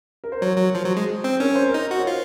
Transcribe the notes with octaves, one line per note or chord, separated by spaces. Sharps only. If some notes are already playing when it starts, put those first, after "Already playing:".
A#4
C5
F#3 C#5
F#3
F3 C5
F#3
G#3
C4
C#4 A#4
C5
A#4
D#4
F#4
C#5
F4 C5